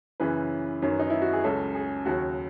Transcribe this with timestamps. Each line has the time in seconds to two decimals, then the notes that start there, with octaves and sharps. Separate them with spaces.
0.20 F#2 C#3 E3 B4
0.82 F#2 D#3 F#3
0.99 D#4
1.10 E4
1.22 F#4
1.33 G#4
1.44 C#2 C#3 F#3 A4
1.75 G#4
2.05 D#2 C#3 F#3 F#4